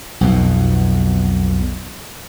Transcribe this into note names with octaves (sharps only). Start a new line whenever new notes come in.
B1 F2 B2